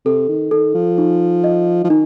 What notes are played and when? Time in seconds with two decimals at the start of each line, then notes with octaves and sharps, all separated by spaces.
0.05 C3 A4
0.28 D#3
0.51 D#3 A4
0.74 F3
0.98 D#4
1.44 D#5
1.84 F3
1.89 D#3 D#4